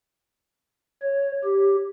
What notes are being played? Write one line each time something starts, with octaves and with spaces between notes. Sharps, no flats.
C#5
G4